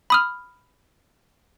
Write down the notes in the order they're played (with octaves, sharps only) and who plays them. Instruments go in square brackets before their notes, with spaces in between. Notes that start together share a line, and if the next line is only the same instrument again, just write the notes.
[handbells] B5 D#6 F6